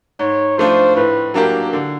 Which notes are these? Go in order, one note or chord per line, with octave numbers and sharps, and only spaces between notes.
G#2 C#5
F3 A3 D4 F4 C5
A2 B4
F#3 A#3 D4 G4 A#4
D3